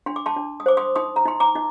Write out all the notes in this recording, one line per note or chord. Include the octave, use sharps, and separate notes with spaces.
D4 C6
D6
A5 C6
D4
D#6
C5 D6
C6 D#6
D#4 C6 D#6
A#5
D#4 C6
A#5 D6
D#4